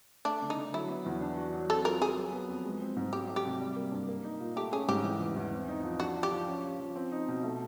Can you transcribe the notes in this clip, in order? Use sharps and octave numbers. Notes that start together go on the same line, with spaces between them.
A3 D4
D3
D#4
D3
F#3 E4
B3
E2
D4
F#4
F#3
C4 A4
F4 A#4
F#3 G#4
F#3
B3
F2
G#3
C4
G#2
F#3 G4
A3
G4
C3
G3
A#3
G2
A#3
D#4
A#2
A3 G4
C#4 G#4
G#2 G4
E3
E2
E2
C4
D#4
F3
D4 F#4
F3
G4
F3
C#4
F3
F3
C4
D#4
B2
A3